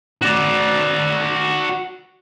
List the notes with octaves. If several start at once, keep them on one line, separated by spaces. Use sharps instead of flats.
F#4 D5